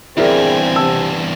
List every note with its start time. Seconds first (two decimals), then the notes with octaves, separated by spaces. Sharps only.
0.17 E2 G2 C4 E4 G#4 A#4 D5 G#5
0.76 C3 A5 E6